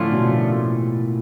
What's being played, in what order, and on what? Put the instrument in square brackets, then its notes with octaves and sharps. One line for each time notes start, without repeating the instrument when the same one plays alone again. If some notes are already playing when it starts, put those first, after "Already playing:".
Already playing: [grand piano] A2 [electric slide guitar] D3 F3 A3 C#4 F4
[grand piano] B2
A#2